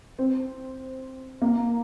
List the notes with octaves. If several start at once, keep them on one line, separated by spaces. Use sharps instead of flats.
C4
A#3